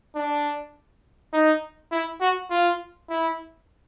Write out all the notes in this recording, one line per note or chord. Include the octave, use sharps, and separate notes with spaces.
D4
D#4
E4
F#4
F4
E4